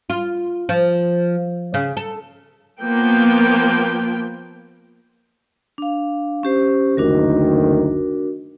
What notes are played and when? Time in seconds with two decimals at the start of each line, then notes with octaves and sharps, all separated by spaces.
0.10 F4
0.69 F3
1.74 C#3
1.97 A4
2.80 F3 A#3 B3 G5
5.78 D4 F5
6.43 C#4 G4 C5
6.97 F#1 D2 D#3 D4 F#4 A#4